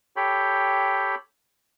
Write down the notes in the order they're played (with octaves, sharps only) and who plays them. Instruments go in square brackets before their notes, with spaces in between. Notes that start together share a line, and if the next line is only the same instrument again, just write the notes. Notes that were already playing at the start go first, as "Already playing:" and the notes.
[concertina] G4 A4 C#5 G5 B5